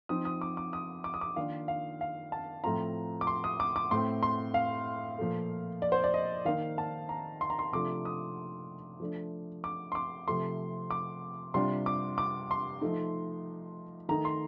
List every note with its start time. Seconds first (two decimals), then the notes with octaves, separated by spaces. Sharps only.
0.09 F3 C4 D#4 D#6
0.25 D#6
0.41 D6
0.57 D6
0.73 D#6
1.04 D6
1.14 D#6
1.21 D6
1.36 D#3 A#3 D4 F4 F5
1.68 F5
2.01 F5
2.32 A5
2.64 A2 F3 A3 C4 F4 A#5
3.21 D6
3.27 C6
3.44 D#6
3.60 D6
3.76 D6
3.91 A2 A3 C4 C6
4.23 C6
4.54 F5
5.18 A#2 F3 A3
5.82 D5
5.92 C5
6.04 D5
6.14 D#5
6.45 D#3 A#3 D#4 F5
6.78 A5
7.09 A#5
7.41 C6
7.50 A#5
7.59 C6
7.72 C3 F3 A3 D4 F4 D6
8.05 D#6
9.00 F3 A3 D4
9.64 D6
9.92 C6
9.95 D6
10.28 C3 F3 A3 C6
10.91 D6
11.54 C3 G3 D4 F4 C6
11.86 D6
12.18 D6
12.51 C6
12.81 F3 A3 D#4
14.09 D#3 A3 D#4 A#5
14.25 C6